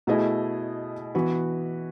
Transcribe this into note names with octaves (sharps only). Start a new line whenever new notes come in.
B2 A3 E4 G#4 D#5
E3 B3 F#4 B4